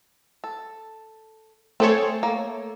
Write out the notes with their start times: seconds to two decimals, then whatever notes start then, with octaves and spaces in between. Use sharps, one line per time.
0.44 A4
1.80 A3 C4 G#4 A4 C5 C#5
2.23 A#3